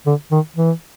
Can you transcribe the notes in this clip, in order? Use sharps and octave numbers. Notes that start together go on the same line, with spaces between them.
D3
D#3
E3